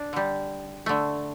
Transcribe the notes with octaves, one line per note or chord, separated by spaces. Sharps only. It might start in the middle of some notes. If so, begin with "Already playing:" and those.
Already playing: D4
D3 G3
D3 A3